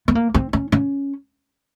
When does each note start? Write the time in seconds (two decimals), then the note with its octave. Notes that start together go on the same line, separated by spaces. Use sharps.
0.08 B3
0.15 A#3
0.34 C4
0.53 C#4
0.72 C#4